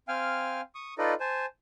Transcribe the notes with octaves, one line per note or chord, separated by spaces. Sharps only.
C4 F5 G5 G#5 F6
C#6 D#6
D#4 F4 A4 B4 D5 D#5
C5 G#5 A5